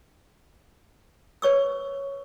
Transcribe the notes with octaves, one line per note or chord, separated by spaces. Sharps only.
B4 C#5 C#6 E6